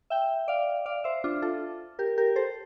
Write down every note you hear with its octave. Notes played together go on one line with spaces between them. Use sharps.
E5 G5
D5 F5
D5 F5
C5 E5
D4 F4
F4 A4
G4 A#4
G4 A#4
A4 C5